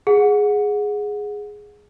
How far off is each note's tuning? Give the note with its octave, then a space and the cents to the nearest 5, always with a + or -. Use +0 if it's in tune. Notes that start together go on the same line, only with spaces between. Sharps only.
G#4 +0 F#5 -20